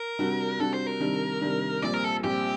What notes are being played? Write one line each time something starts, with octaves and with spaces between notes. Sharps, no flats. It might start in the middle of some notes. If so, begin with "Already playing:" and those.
Already playing: A#4
C3 G3 D4 F#4
C3 G3 D4 F#4 A4
C5
A#4
C3 D#3 G3 D4
C3 D#3 G3 D4
A#1 A#2 G3 C4 D5
A#4
A4
A#1 A#2 G3 C4 G4